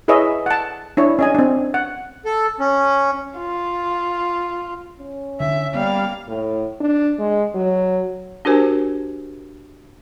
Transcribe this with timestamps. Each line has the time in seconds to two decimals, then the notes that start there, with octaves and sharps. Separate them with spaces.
0.08 E4 G#4 B4 C#5 D#5 E5
0.46 F#5 A5
0.97 D4 E4 C#5
1.19 C#4 D#5 G#5
1.35 C4 D4
1.74 F#5
2.25 A4
2.60 C#4
3.37 F4
5.00 C#4
5.40 D3 E5
5.74 G3 A#3 B3 F5
6.29 A2
6.81 D4
7.19 G#3
7.55 F#3
8.45 D4 F#4 G4 A#4 C5 G#5